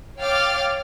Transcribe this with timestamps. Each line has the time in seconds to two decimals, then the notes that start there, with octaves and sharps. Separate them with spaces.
0.19 C#5 F5 G5 D6 F6 A6